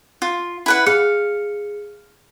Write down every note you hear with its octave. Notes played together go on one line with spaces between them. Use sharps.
F4
E4 B4 F#5
G#4 F5 C#7